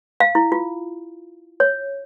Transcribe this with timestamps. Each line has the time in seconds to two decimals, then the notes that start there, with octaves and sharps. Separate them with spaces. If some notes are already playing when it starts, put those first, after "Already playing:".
0.20 F5
0.35 E4
0.52 F4
1.60 C#5